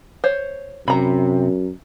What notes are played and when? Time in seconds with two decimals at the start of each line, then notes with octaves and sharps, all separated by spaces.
0.24 C5 C#5
0.88 F#2 C3 A#5 B5